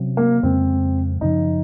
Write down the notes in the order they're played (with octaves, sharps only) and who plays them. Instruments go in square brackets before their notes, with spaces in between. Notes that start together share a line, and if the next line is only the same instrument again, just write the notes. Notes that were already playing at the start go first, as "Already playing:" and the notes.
Already playing: [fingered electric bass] C3 F#3 C#4
[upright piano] A#3
[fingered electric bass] F2 C#3 G#3 [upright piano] C4
[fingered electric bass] F#2 C#3 F3 [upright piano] D#4